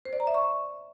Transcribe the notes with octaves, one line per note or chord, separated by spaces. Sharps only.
C5
D5
A#5
E5
C#6